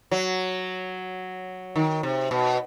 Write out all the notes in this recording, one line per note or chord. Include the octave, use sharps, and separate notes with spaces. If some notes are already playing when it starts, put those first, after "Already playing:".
F#3
D#3
C3
B2